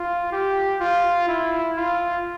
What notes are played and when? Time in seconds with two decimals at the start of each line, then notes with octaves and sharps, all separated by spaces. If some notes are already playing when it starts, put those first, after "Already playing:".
Already playing: F4
0.32 G4
0.81 F4
1.28 E4
1.77 F4